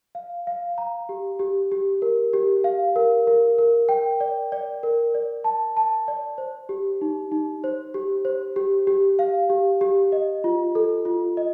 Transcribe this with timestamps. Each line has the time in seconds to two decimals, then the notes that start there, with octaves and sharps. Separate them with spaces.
0.15 F5
0.47 F5
0.78 A#5
1.09 G4
1.39 G4
1.72 G4
2.02 A#4
2.33 G4
2.64 F5
2.96 A#4
3.27 A#4
3.58 A#4
3.89 G5
4.20 D5
4.52 D5
4.83 A#4
5.14 D5
5.44 A5
5.77 A5
6.08 D5
6.38 C5
6.69 G4
7.01 D#4
7.32 D#4
7.64 C5
7.94 G4
8.25 C5
8.56 G4
8.87 G4
9.19 F5
9.50 G4
9.81 G4
10.12 D#5
10.44 F4
10.75 A4
11.05 F4
11.37 D#5